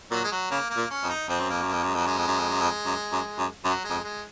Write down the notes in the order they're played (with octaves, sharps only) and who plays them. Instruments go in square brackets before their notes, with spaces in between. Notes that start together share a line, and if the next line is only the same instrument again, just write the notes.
[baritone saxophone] A#2 [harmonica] F#3
[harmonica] G#3
F#3
[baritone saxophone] C#3 [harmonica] A#3
[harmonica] A#3
[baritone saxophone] A#2
[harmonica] C#4
[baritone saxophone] F2
[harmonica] D#4
[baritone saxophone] F2 [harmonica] C4
[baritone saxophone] F#2
[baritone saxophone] F2 [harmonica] A#3
[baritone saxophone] F#2
[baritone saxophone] F2 [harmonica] A#3
[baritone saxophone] F#2 [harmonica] G#3
[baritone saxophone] F2 [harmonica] F#3
[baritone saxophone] F#2 [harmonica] G#3
[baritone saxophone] F2
F#2
F2
F#2
F2
F#2
F#2
F#2
[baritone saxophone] F#2 [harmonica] F#3
[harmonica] G#3
[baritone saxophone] F2
[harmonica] G#3